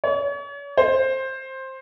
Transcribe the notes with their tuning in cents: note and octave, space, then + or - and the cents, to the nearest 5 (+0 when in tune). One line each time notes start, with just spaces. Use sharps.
C#5 +40
C5 +15